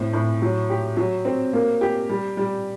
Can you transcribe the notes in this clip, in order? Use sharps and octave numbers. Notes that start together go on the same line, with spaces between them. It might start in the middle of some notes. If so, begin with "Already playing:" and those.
Already playing: A2 C4
A2
F#3
G4
F#3
C4
A#3
G4
G3
G3